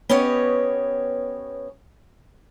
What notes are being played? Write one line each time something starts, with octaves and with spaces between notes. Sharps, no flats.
B3 C#4 G4 C#5 D#5